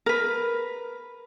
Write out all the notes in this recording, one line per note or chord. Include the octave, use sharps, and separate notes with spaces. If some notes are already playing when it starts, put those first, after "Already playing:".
A#4 B4